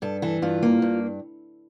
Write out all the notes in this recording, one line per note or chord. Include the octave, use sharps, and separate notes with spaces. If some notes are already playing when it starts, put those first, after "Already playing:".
G2 A4
E3 A4
G2 F4
A#3
G2